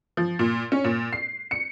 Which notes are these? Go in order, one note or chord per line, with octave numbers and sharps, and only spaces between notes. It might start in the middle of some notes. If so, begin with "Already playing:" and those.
F3
A#2
C#4
A#2
C7
C#7